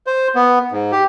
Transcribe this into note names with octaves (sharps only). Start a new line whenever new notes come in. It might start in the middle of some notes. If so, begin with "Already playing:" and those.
C5
B3
G#2
G4